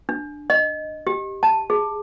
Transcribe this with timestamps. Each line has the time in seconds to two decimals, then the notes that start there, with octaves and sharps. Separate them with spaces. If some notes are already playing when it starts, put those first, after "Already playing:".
0.09 D4
0.50 D#5
1.07 G4
1.43 A5
1.70 G#4